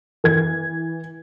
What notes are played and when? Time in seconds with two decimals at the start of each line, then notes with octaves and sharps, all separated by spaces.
0.24 E3 G#6